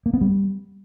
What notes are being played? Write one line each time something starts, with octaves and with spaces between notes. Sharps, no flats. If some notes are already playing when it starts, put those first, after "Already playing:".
A#3
B3
G3